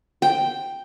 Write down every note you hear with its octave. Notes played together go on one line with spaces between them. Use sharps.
G5